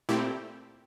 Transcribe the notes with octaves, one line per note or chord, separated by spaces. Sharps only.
A#2 A3 C4 E4 G4